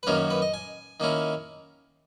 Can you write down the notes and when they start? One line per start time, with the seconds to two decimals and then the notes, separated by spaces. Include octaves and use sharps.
0.03 B4
0.07 F#2 D#3 F#3 A#3 C#4 A#4
0.30 B4
0.42 D#5
0.54 G#5
1.00 D#3 A#3 C#4 E4